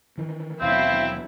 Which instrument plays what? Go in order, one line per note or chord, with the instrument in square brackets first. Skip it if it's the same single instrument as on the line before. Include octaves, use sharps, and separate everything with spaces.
[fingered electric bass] D#3 E3
[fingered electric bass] D#2 B2 E3 [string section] F#3 E4 [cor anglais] C4 [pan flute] F5